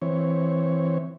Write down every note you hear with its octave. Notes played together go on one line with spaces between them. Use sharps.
E3 C4 C#5